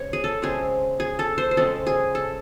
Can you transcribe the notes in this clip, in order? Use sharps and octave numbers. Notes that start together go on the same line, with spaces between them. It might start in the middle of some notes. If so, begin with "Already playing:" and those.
Already playing: C#3 G#3 C4 C#5
G#4
A4
C#3 G#3 C4 G#4
G#4
A4
C5
C5
C#3 G#3 C4 A4
G#4
A4